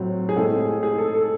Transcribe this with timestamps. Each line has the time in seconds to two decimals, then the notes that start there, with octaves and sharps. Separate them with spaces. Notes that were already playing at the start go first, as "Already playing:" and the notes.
Already playing: A2 F#3 C4
0.29 G#4
0.36 A2 G#3 C4 A4
0.60 G#4
0.83 G#4
0.98 A4
1.14 A4